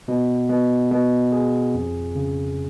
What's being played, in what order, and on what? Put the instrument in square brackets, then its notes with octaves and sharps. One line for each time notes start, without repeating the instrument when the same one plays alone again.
[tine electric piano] B2
B2
B2
G#4
F2
C#3